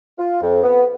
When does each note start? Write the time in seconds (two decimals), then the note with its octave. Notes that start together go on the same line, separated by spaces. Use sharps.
0.18 F4
0.41 F2
0.63 B3